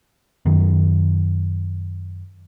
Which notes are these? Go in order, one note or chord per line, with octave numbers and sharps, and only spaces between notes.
F#2 D#3